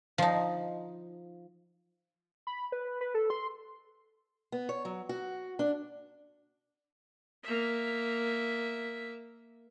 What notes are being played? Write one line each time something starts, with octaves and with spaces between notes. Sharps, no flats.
F3 D#4
B5
B4
B4
A4
C6
B3
C#5
F#3
F#4
D4
A#3 E5